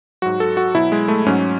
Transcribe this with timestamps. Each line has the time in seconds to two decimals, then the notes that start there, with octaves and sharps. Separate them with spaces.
0.22 G#2 F#3 F#4
0.40 A4
0.57 F#4
0.74 B2 F#3 E4
0.92 G#3
1.08 A3
1.26 G#2 F#3 C#4